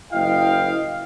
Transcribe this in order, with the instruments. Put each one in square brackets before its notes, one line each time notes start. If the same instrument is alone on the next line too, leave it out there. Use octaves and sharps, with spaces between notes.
[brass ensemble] F#1 E4 D#5 F5 G5